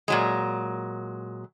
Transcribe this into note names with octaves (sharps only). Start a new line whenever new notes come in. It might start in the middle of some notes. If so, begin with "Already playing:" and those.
A#2 F#3 G#3